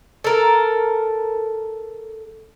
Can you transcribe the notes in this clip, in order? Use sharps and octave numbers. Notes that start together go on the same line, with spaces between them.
A4 A#4